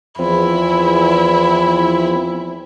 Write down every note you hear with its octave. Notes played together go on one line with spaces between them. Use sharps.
E2 F3 C4 E4